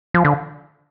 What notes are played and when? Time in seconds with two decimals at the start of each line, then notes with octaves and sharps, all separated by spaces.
0.14 F3
0.25 D3